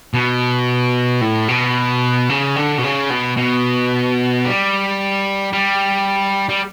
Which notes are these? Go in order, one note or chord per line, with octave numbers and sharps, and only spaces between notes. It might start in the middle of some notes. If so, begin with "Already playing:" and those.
B2
A2
B2
C#3
D3
B2
C#3
B2
B2
G3
G3
G3